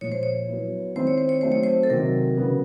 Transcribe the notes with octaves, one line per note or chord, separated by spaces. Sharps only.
A#2 F3 G#3 C#5
C5
C#5
F#3 B3 E4
D#3 G#3 C4 E4 C5
C#5
C5
C#5
F#3 A3 C4 D#4 C5
C#5
C5
A4
C3 D#3 F#3 A#4
C#3 F#3 B3